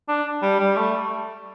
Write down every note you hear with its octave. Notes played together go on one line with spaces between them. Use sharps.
D4
G3
G3
A3